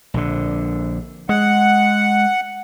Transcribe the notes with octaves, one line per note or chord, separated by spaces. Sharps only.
A#1 D3
G#3 F#5